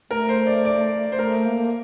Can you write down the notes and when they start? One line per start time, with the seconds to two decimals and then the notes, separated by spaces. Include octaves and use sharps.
0.10 A3 A#4
0.29 C5
0.47 D5
0.65 D5
1.12 C5
1.19 A3 A#4
1.46 A#3